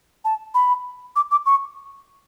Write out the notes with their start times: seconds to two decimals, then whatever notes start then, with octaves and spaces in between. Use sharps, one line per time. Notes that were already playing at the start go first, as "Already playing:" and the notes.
0.25 A5
0.54 B5
1.16 D6
1.32 D6
1.46 C#6